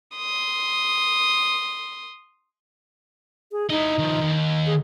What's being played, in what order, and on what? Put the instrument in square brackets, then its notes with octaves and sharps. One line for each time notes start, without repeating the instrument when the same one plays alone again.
[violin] C6 D#6
[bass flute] G#4
[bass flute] D#4 [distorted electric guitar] E4 D#5
[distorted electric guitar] D#3 F3
D#2
[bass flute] G#4